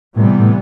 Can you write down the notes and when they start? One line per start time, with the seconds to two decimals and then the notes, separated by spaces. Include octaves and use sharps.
0.16 A2 C3 E3 G3 B3
0.39 A2